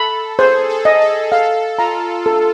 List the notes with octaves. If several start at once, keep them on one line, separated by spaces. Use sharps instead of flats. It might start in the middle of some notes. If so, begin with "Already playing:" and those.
Already playing: A4 B5
G#4 C5
A4
D#5
A4
A4 F5
F4 A#5
A4